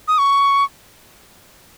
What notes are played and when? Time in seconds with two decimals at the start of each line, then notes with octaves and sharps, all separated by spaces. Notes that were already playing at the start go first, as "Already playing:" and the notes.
0.08 D#6
0.18 C#6